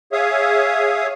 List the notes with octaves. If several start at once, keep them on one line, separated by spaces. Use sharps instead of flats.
G#4 C#5 E5 F5 D#6